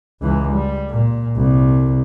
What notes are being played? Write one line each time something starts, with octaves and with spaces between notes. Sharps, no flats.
C#2 E3
G3
A#2
C2